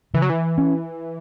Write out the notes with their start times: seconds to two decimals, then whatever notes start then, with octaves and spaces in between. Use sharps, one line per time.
0.14 C#3 E3
0.22 F#3
0.30 E3
0.58 C#4